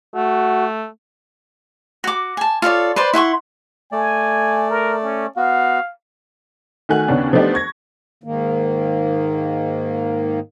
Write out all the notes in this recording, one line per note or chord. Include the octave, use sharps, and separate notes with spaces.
A3 F#4
F#4 D6
G#5 A5
F4 A4 C#5 D5
B4 C5 D5 C6
E4 F#5 C6 C#6
A3 D5 G#5
A#4
C#4
B3 F#4 F5
D#3 A3 F#4 G#5 F#6
D#2 C#3 B3 C#4 D4
F3 A3 B3 D4 D#4 G4
C#6 G#6 A#6
G#2 D#3 A#3